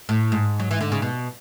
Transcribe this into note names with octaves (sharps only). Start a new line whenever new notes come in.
A2
G#2
F#3
E3
D3
C#3
B2